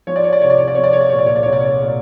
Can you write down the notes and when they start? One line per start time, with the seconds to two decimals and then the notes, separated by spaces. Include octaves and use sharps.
0.07 F3 C#5
0.16 D5
0.24 C#5
0.32 D5
0.42 C2 C#5
0.50 D5
0.58 C#5
0.68 D5
0.75 F3 C#5
0.83 D5
0.93 C#5
1.00 D5
1.10 A#2 C#5
1.19 D5
1.26 C#5
1.35 D5
1.43 C2 C#5
1.53 D5
1.61 C#5
1.81 A#2